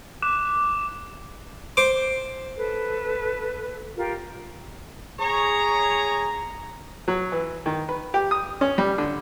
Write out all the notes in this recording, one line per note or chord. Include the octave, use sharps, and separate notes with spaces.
D6 F#6 E7
C5 D6
A4 B4
F4 G4 A#4
G#4 C#5 A#5
F#3
E3
D#3
B4
G4
D#6
C#4
G3
D3